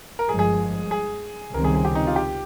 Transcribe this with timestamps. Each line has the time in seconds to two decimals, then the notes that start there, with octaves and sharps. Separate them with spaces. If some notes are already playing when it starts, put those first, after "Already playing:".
0.19 A#4
0.29 G1 G2 F3 G#3 G#4
0.39 G#4
0.91 G#4
1.54 C#2 C3 D#3 G3 C4 A#4
1.64 G#4
1.75 G#4
1.85 G4
1.95 D#4
2.07 F4
2.16 G4